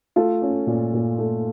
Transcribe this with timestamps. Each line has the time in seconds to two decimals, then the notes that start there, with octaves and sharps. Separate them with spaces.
0.16 A3 F4 A4
0.42 C#4
0.67 A#2
0.94 A#2
1.18 A3